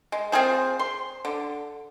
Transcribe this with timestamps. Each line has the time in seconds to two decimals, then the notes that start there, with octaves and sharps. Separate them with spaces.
0.12 G#3
0.32 C4 F4 G#4 C5
0.79 C6
1.25 D3